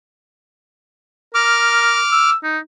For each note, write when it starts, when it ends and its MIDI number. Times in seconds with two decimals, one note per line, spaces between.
1.35 1.98 70
1.35 2.30 86
1.35 2.30 89
2.12 2.35 88
2.43 2.59 63